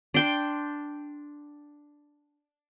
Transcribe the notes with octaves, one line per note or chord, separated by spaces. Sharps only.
D4 G5 C6